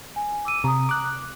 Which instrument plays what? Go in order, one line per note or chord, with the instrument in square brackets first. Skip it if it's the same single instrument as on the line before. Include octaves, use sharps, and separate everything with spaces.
[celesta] G#5
D6 E6 D#7
[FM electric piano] C3 [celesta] A#5 D#6
[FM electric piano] D6 F#6